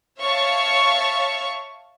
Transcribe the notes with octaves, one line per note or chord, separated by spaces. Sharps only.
C#5 E5 F5 A5 C#6